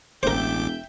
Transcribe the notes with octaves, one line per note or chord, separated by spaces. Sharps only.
E1 A1 A#4 C5 E5 G5 D6 G6